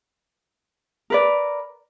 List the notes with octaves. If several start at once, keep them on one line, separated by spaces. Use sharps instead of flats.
A#4 B4 D5